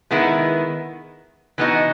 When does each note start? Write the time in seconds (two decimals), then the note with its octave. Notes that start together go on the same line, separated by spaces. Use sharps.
0.11 D#3 G#3 B3 E4
1.58 E3 B3 D#4 F#4